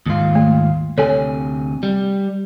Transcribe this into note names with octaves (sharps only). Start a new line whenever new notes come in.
D#2 G#2 F4
A3
D2 C3 A4 C#5 G#5
G3